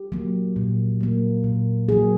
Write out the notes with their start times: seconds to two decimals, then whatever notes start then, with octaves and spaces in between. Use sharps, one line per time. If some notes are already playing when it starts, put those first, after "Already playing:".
Already playing: G4
0.12 F#3 A#3
0.56 A#2
1.01 F#3 A#3
1.44 A#2
1.88 F#3 A#3 G#4